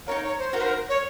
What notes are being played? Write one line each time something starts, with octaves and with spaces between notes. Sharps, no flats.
D#4 F#4 A#4 C#5 F5
C#5
C5
D#4 F#4 A#4 C#5 F5
C5
A#4
C#5